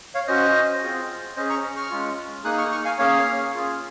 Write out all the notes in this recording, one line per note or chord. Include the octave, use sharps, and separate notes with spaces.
C#5 F5
C#4 F#4 C5 D#5
C4 F4 G#4
C#4 G#4 C5 D#5
A#5 C#6
C#6 F6
G#3 C#4 F4
A#3 D#4 G#4 D#6 F#6
C#6 F6
C#6 F6
F5 G#5
A#3 C#4 G#4 C#5 F5
C#4 F4 G#4